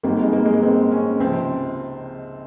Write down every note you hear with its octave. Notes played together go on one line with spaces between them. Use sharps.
G#1 G#2 G3 A#3
G#3
A#3
G#3
A#3
C4
C#4
C#2 C3 F3 C4